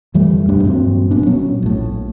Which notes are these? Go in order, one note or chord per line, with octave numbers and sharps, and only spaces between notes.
F2 E3 G3 A3
E1 G2 G3 D4
G2 A#2 F#3 C4
E1 B3 D4
A#2 F#3 C#4
A#1 A2